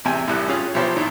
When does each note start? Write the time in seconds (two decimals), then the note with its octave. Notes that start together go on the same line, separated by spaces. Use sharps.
0.05 A1 E2 C3 G5 G#5
0.28 C2 A2 G3 F#6
0.48 C#4 F4 G#4
0.74 B1 F3 G4 C5 C#5 B5
0.96 G#1 A#2 D#3 E4